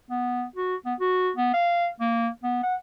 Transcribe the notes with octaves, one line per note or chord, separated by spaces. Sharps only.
B3
F#4
B3
F#4
B3
F5
A#3
B3
F#5